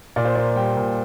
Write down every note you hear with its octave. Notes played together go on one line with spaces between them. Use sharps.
A#2 D5
C5
A#3 D5
G3 G5
A#2